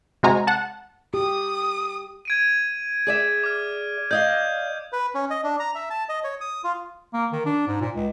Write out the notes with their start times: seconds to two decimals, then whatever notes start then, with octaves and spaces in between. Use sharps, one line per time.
0.23 C3 G#3 F#4 G#5 A#5
0.47 F#5 A5
1.14 G4 D#6
2.25 G#6 D7 D#7
3.07 G#4 D5 E5
3.44 D6 F6
4.11 D5 D#5 F5 D#6 G6
4.93 B4
5.15 C#4
5.31 D#5
5.44 D4
5.60 A#5
5.75 E5
5.90 A5
6.09 D#5
6.24 C#5
6.41 D#6
6.64 F4
7.13 A#3
7.32 D#3
7.46 D4
7.67 G#2
7.81 A#2
7.95 C#2